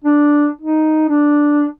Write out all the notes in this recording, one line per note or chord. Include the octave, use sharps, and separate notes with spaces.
D4
D#4
D4